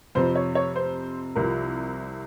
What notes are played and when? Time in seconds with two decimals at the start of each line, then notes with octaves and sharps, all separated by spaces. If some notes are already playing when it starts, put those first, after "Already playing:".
0.15 F2 C3 F3 C5
0.35 C#5
0.55 C#5
0.76 C5
1.35 C2 C3 F3 A#4